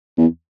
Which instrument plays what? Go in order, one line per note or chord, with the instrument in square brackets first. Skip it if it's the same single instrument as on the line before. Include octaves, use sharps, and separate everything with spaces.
[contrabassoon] E2